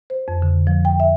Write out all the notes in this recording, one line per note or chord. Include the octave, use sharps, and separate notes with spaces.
C5
F2
D3
F3
G5
E5